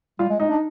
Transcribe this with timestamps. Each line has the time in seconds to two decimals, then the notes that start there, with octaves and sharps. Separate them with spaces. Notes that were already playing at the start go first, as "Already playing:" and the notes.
0.19 G3 F4
0.29 G#3
0.40 G#3 D#4
0.50 D4